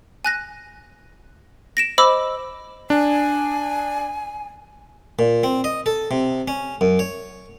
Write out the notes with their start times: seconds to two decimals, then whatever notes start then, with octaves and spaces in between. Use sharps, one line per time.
0.25 G#5 F#6 A#6
1.77 A#6 D7 E7
1.98 C5 D#5 B5 D6 E6
2.90 D4 G#5
5.19 A#2
5.44 C4
5.64 D#5
5.86 A4
6.11 C3
6.48 C#4
6.81 F#2
6.99 C#5